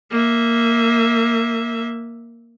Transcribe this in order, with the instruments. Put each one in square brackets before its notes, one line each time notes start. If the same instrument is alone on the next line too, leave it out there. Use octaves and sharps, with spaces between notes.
[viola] A#3 E5